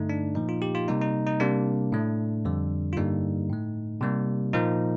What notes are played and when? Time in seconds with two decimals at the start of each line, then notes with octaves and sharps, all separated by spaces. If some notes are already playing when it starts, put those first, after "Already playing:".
Already playing: G2 D3 A3 D#4
0.09 D4
0.35 A#2 F3 A#3 D#4
0.49 F4
0.62 G4
0.75 F4
0.88 C3 G3 A#3 D#4
1.01 D#4
1.26 D#4
1.40 C3 G3 A#3 D4
1.92 A2 A3
2.45 F2 D3 G3
2.93 F4
2.97 G2 D3 G3 A#3 D#4
3.50 A2 A3
4.01 C3 G3 A#3
4.53 A#2 F3 A#3 D#4